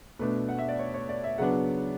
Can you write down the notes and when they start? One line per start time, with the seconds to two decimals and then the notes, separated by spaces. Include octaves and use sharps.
0.19 B2 A3 D4 B4
0.49 F#5
0.59 E5
0.69 D5
0.79 C#5
0.94 C#5
1.09 D5
1.24 E5
1.38 C#3 F#3 B3 D4 F#5